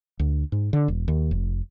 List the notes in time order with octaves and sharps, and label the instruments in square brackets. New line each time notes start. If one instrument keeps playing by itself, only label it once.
[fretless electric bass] D2
G#2
D3
E1
D#2
F1